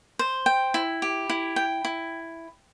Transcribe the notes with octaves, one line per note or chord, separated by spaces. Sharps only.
C5
G5
E4
G4
E4
G5
E4